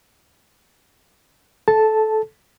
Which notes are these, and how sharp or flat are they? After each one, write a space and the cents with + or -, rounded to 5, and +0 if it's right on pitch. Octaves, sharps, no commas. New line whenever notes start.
A4 -20 A5 +0